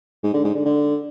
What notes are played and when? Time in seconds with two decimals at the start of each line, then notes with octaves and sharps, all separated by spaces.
0.23 G#2
0.34 D3
0.44 G#2
0.55 D3
0.65 D3